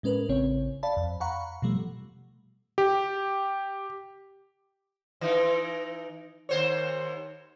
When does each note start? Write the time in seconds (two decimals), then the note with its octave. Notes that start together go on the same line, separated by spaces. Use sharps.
0.03 A2 G#3 C#4 A#4 B4
0.29 A1 C#3 C4 C#5
0.83 D5 F5 A5 B5
0.97 F2
1.20 F5 F#5 A#5 B5 C#6 F#6
1.62 B2 F3 G3 A3
2.78 G4
5.21 E3 D#4
6.49 D#2 C5 C#5